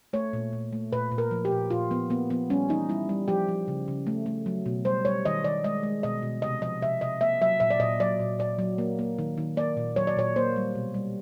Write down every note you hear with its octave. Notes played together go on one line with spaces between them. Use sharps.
A3 C#5
A#2
A#2
A3
A#2 B4
A#2
A#4
F3
G4
A#2
A#2 F4
F3 B3
A#3 B3
F3 B3
G3 C#4
E3 D#4
G3 E4
G3
F3 G4
F3
C#3
C#3
A3
A3
F#3
B2
G3 C5
G3 C#5
D#3 D#5
D#3 D5
G#3 D#5
G#3
B2 D#5
B2
C3 D#5
F3 D#5
C3 E5
C3 D#5
A#3 E5
F#3 E5
A#2 E5
D5
A#2 D#5
F#3 D5
A#2
A#2 D5
F#3
A#3
A#3
D#3
D#3
A#3 D5
A#2
F#3 C#5
D5
A#2 C#5
A#3 C5
G3
B2
G3